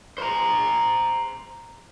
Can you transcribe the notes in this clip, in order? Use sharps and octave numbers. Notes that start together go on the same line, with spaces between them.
C5 A#5